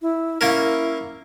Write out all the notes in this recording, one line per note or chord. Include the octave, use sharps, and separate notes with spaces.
E4
A#3 C#4 E4 A#4